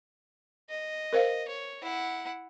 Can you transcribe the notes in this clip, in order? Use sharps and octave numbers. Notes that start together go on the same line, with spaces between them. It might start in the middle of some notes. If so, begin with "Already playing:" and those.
D#5
A#4 C5 F5
C#5
E4 F#5